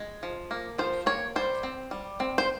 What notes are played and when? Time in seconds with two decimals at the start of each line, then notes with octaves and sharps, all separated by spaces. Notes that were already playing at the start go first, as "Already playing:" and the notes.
Already playing: G#3
0.23 F3
0.51 A#3
0.78 F3 C5
1.06 A#3 C#5
1.36 G3 C5
1.63 C4
1.91 G3
2.20 C4
2.38 C5